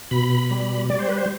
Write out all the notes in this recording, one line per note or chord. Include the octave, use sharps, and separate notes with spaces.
B2 B5
G3
G3 D5
C5
B4
C5